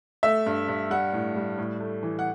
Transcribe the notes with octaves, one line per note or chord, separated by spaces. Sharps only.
A3 E5
G2
G2
G3 F#5
A2
G3
A2
A3
E3
F#5